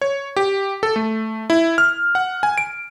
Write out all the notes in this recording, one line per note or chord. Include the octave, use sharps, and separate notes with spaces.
C#5
G4
A4
A3
E4
F6
F#5
G#5
D7